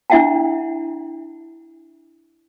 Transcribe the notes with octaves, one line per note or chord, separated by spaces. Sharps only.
D4 E4 E5 F#5 G5 A5